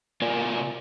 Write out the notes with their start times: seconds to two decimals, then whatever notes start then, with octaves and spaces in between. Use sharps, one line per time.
0.22 C3 F4 A#4 D5 G#5